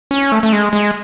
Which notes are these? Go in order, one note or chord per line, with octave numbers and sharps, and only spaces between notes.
C#4
A3
A3
G#3
G#3